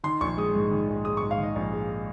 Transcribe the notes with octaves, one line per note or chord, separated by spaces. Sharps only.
D#3 C6
A#1 C#6
G#3 D#6
G#2
D#3
A#1
G#3 D#6
C#6
G#2
F5
D#3
D#5
A#1
G#3